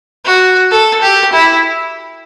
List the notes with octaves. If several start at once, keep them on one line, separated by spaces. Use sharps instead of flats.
F#4
A4
G4
E4